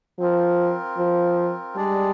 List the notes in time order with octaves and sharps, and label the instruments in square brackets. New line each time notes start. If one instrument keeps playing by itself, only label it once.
[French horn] F3 [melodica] C4 F4 A#4
[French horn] F3
[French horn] G3 [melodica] G#3 D4 G#4 D5